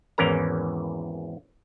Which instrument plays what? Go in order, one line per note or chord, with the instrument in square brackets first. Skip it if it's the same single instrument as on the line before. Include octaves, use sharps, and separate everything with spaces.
[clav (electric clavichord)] G#1 E2 E3 C#4 A#4 A#5